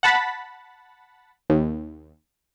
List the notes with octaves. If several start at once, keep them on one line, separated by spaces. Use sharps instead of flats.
F#5 A5 B5 A6 B6
D#2